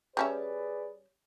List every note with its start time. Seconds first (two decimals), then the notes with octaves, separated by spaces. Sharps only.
0.17 G3 C#4 G#4 B4 D5 E5